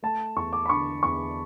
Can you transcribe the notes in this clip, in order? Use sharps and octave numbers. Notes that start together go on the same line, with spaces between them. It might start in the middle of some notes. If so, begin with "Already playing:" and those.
A3 A5
E2 C#6
D6
B5
D3 C#6
E2 C#6